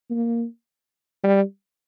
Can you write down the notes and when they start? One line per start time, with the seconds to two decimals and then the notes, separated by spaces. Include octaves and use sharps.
0.11 A#3
1.24 G3